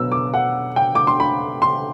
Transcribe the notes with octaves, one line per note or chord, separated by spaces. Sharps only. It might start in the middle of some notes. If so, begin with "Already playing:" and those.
Already playing: B2 F#3 E6
D6
F#5
G5
D6
C6
B5
C6